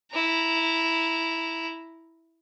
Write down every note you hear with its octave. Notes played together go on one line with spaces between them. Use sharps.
E4 A#5